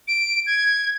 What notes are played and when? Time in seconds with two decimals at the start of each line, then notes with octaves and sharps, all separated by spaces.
0.08 D7
0.47 G#6